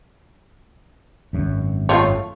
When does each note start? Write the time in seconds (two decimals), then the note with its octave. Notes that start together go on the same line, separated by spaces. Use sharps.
1.33 G#1 F#2
1.89 A3 F4 C#5